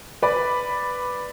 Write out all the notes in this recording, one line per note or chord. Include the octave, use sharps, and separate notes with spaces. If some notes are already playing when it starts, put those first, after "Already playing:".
B4 D5 B5